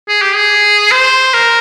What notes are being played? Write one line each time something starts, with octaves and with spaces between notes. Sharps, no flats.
G#4
G4
G#4
C5
A#4